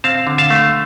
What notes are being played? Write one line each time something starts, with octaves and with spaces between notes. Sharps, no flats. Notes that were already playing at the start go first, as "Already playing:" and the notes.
C4 F5 A5
D3
F5 A5
A3